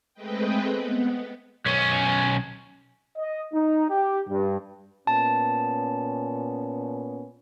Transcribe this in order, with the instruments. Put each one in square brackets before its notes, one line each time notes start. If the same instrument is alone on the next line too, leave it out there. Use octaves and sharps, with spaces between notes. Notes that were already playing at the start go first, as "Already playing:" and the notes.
[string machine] G#3 A3 C4 B4 D#5 G5
B3
[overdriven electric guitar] B1 C#4
[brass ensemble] D#5
D#4
G4
G2
[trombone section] A#2 B3 C#4 [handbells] A5